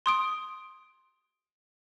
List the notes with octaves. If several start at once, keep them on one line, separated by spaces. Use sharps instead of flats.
C6 D#6 D7